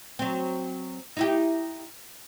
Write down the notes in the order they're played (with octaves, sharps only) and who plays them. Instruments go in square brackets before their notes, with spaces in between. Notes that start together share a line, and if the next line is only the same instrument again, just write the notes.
[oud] F#3 C4
D#4 E4 G4